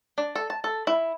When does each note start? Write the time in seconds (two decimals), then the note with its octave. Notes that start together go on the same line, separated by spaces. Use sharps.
0.18 D4
0.35 A4
0.50 A5
0.64 A4
0.87 E4